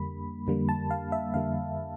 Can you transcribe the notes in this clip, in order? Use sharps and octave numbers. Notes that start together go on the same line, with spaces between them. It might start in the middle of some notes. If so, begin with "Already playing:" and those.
Already playing: F2 D3 G3 A#3 B5
F2 D3 G3 A#3
A5
F5
E5
F2 D3 G3 A#3 F5